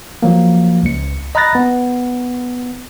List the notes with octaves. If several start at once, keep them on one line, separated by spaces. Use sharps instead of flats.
F3 F#3 A#3
C#2 C#7
D#5 A#5 B5 F#6 A6 A#6
B3